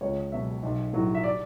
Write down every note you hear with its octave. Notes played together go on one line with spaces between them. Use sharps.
C#2 C#5
B2 F#3 E5
B1
A2 F#3
E5
D5